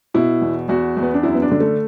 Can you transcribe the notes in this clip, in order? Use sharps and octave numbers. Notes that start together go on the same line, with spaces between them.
B2 E4
E2
E2 F#4
E2
B3
D4
F#2 E4
B3
D4
D3
A3